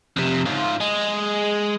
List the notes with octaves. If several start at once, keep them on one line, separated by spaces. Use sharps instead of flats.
F2 C3
G#2 F4
G#3